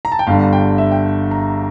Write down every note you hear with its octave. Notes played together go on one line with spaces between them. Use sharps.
A#5
A5
G5
G1 G2 D3 F5
G5
E5
G5
A#5